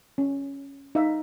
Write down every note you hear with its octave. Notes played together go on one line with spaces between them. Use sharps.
C#4
D#4 E5 F5